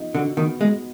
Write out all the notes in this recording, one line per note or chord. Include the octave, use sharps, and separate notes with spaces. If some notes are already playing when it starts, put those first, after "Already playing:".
Already playing: F3 B3 D#4
D3 F#4
D#3 B3
G#3 B3